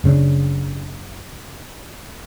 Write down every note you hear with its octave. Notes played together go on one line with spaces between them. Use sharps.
F#1 C#3 C4 D4